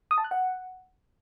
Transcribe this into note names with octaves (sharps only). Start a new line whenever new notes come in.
D#6
A5
F#6
F#5